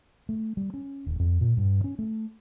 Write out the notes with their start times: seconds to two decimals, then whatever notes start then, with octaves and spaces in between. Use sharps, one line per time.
0.29 A3
0.57 G3
0.74 C#4
1.06 D#1
1.19 F2
1.41 A#2
1.57 G2
1.84 C#4
1.99 A3